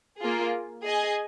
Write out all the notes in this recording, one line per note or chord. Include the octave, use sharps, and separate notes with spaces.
A#3 F4 G#4
G#4 D#5 G#5